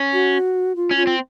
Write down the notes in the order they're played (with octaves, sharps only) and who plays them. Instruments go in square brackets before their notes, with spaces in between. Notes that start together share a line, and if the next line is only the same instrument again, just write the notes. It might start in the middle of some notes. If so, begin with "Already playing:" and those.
Already playing: [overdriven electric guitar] C#4
[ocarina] F#4
F4
[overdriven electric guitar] C#4
[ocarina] F4
[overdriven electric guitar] C4